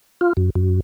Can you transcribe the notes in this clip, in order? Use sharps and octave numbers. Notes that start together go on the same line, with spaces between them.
F4
F#2
F#2